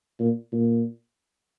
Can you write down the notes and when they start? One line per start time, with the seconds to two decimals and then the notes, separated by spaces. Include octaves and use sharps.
0.19 A#2
0.52 A#2